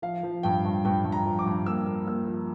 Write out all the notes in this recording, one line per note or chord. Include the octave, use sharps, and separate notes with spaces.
F3 F5
F3
G2 G5
G2
G2 G5
G2
A#5
F3
D6
G2
A#3 E6
A#3
A#3 E6
F3